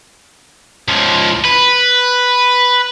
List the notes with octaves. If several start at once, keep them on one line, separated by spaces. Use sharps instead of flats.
C#2 F3
B4